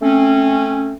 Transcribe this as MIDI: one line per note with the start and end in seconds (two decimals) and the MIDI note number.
0.02 0.93 57
0.02 0.93 60
0.02 0.93 61